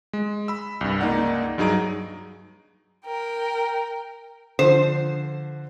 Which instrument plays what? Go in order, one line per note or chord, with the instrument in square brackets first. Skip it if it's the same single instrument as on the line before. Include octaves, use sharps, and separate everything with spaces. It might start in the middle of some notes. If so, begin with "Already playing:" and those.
[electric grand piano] G#3
B5 E6
C2 G2
C#2 A#3 D#4 D5 F#5
G2 F#3 D#4 G#4 A#5 D7
[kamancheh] A#4 G5
[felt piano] D3 F3 [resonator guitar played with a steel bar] C5